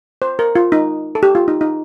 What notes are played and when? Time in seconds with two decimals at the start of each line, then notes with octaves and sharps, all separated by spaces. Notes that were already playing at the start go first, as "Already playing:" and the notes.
0.22 C5
0.39 A#4
0.55 F4
0.72 D#4
1.15 A4
1.23 G4
1.35 F4
1.48 D#4
1.61 D#4